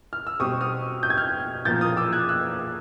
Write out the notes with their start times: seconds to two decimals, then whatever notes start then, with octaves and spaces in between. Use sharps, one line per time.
0.13 F6
0.27 E6
0.40 B2 G3 C4 C#6 D#6
0.61 D#6 F6
1.03 G6
1.10 G#6
1.18 F6 G6
1.65 A#2 F3 A#3 G6 A6
1.81 D#6 F6
1.97 D6 E6
2.13 F#6 G#6
2.29 E6 F#6